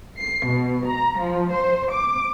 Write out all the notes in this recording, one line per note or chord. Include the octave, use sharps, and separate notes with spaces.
C7
B2
A#5
F3
C5
D6